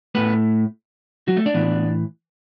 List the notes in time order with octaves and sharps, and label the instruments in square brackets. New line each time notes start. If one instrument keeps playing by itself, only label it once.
[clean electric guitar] A2 A3 B3 B4
F#3 F#4
A3 A4
D4 D5
A2 E3 B3